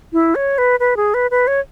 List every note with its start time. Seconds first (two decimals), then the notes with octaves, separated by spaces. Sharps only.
0.13 E4
0.35 C#5
0.58 B4
0.80 B4
0.97 G#4
1.14 B4
1.31 B4
1.47 C#5